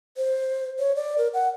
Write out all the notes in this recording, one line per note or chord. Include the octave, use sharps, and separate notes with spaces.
C5
C#5
D5
A#4
F#5